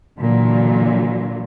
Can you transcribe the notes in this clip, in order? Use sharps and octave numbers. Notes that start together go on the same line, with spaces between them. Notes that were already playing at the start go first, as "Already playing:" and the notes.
A#2 D3 E3 F#3